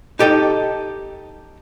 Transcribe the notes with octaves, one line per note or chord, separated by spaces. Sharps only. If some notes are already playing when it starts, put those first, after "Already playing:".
D#4 G4 A4 D#5